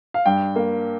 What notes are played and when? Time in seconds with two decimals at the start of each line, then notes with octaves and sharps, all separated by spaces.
0.14 F5
0.26 G2 G5
0.56 A#3